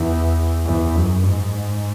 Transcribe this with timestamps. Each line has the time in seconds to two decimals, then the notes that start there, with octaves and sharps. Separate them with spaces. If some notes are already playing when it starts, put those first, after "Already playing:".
Already playing: E2
0.66 E2
0.96 F#2
1.25 G#2